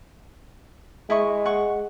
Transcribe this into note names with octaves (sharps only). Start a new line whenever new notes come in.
G#3 E4 D#5 C#6
F#5 C#6